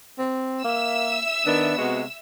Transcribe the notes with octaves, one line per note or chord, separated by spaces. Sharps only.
C4
A#3 E5 E6
D#3 B3 D4
C3 G#3 B3 F#4